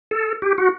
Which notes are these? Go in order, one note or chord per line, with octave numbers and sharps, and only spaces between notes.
A4
G4
F#4